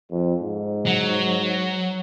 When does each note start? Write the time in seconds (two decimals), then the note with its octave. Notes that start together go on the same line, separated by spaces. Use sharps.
0.11 F2
0.42 G#2
0.86 F#3